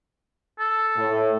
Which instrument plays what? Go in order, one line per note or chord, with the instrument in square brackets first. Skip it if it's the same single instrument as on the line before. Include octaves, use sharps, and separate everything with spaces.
[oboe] A4
[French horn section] A2